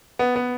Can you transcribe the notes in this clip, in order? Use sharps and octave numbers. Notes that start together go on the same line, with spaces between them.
B3
B3